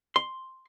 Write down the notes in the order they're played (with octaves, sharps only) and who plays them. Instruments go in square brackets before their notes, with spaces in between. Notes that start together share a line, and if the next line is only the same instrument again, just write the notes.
[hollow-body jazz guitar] C6